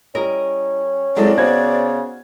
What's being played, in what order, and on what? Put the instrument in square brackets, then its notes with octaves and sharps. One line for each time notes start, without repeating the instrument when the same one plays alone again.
[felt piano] G3 [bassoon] C#4 [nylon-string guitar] E4 A#4 D#5
[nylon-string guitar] F#3 G#3 A4 [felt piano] C4 E4 [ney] D5
[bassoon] C#3 [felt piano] B3 C5 G#6 [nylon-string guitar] D#4 F#4